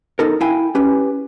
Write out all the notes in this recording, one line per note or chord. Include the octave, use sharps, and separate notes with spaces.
B3 D#4 A4 A#4
E4 F5 G5 G#5
C#4 G4 B4